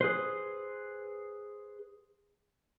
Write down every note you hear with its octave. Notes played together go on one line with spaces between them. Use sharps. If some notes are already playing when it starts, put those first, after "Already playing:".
G#4 B4 C5